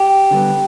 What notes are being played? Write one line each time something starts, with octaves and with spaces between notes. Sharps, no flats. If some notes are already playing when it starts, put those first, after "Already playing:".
Already playing: G4
D3 G3 B3